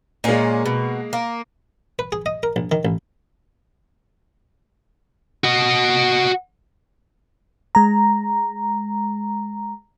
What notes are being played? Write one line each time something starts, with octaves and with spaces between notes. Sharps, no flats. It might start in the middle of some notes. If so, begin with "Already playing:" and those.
A#2 G#3 A#3 C#4
B2
A#3
B4
G#4
D#5
A#4
A#1
D#3
A1
F#4 D#5
G#3 A#5